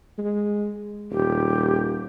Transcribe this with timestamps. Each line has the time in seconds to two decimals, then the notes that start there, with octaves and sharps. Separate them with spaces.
0.18 G#3
1.12 D#1 G4